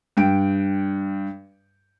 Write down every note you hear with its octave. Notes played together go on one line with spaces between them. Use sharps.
G2 G5 D7